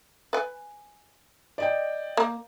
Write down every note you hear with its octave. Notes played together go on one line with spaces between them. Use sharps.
B4 G#5
D5 D#5 G5
A#3